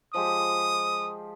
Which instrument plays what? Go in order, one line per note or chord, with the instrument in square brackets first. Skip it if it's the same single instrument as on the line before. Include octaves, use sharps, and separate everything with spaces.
[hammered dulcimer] F3 G#3 G4 [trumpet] D#6